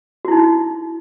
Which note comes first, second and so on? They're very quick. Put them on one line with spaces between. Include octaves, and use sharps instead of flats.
F#4 E4 D#4